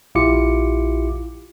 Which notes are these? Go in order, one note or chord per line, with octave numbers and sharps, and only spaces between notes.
A#1 E4 F4 G4 D6 C#7